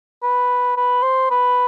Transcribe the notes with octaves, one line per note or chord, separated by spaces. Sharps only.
B4
B4
C5
B4